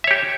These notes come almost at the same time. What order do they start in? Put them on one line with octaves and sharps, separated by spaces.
E5 C#5 G4